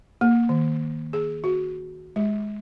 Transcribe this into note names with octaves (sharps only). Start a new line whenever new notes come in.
A#3
D#3
G#4
F#4
G#3